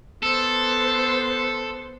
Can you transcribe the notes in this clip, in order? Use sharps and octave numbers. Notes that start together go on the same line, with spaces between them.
B3 A4 C5